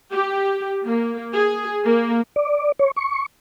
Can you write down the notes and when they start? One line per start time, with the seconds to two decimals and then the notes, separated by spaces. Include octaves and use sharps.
0.12 G4
0.85 A#3
1.34 G#4
1.84 A#3
2.36 D5
2.79 C#5
2.96 C#6